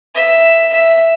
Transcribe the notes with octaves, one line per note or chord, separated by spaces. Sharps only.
E5
E5